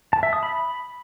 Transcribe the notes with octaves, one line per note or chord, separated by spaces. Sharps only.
A5
E5
D#6
B5